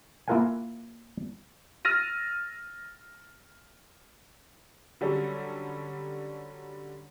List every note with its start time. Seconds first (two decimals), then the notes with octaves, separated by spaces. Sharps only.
0.28 A#3 E4 F4 A#4 F#5 G#5
1.85 E6 F6 A6 A#6 D#7
5.01 D3 F#3 G3 C#4 G4 A4